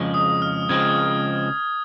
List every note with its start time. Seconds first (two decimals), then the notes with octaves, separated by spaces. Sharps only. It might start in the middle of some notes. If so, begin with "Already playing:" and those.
Already playing: F2 C#3 F3 G#3
0.14 D#6
0.42 F6
0.69 C#3 F3 G#3 C4 G#6